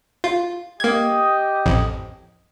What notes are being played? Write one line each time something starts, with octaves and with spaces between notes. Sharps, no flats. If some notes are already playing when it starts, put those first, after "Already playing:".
F4
A#3 G4 D#5 G#6
A1 F2